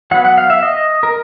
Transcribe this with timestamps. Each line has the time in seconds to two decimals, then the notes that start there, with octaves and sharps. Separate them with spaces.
0.11 F#3 B3 F#5
0.24 F#5
0.38 F5
0.50 E5
0.63 D#5
1.03 A#4